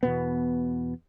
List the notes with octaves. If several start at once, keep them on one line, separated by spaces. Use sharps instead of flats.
E2 B2 B3